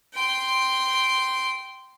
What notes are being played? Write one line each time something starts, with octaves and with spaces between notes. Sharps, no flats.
G5 C6